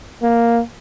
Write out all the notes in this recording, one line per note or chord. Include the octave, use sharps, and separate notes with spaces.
A#3